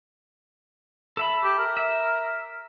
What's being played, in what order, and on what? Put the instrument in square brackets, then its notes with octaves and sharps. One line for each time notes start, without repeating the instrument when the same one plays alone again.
[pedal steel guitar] A4 E5 B5
[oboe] G4
A#4
[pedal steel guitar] E5